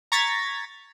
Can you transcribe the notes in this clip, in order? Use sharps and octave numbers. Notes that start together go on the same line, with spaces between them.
A#5 C#6 G#6 A6 B6